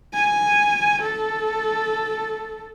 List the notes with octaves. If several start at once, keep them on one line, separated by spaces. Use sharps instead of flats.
G#5
A4